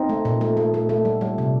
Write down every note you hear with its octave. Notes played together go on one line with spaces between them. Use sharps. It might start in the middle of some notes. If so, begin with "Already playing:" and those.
Already playing: C4 D#4
A3
A#2
A3
A3
A3
A3
G3
G3
C3